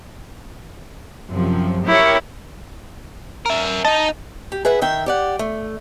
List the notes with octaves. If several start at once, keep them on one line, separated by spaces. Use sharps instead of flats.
F#2 C3 F3
E4 G4 A#4 C#5
A#4 E5
D#4 D#5 A5
G4
G#4 B4 E5 F#5
D#3 E5 G5
G4 D5 F#5
A3